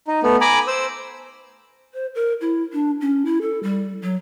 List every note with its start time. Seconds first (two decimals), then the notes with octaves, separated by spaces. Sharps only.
0.07 D#4
0.23 A3 B3
0.41 G#5 A#5 B5 D6
0.68 C5 E6
1.94 C5
2.15 A#4
2.41 E4
2.73 D4
3.01 C#4
3.25 E4
3.42 A4
3.63 G3
4.02 F#3